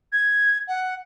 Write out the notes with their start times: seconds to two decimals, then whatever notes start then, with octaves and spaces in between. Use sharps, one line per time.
0.12 G#6
0.68 F#5